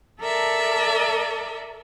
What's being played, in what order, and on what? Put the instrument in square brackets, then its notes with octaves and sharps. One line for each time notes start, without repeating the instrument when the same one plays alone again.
[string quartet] A4 A#4 D5 E5 A5